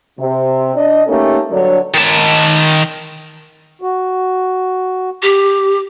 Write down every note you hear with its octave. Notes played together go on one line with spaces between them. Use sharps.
C3
D4 D5 D#5
A3 A#3 C#4 D#4 G4 A4
G2 D3 F#3 A4 C#5 D5
D#3 A5
F#4
G4